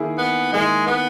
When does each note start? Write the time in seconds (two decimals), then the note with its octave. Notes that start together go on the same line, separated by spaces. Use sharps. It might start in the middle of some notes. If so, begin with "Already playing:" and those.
Already playing: D#3 A#3 E4 G#4
0.18 B3
0.52 D#3 G#3 A#3 E4 G#4
0.87 B3